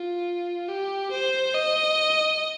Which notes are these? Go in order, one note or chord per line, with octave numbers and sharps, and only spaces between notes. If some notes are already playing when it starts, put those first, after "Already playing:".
Already playing: F4
G4
C5
D#5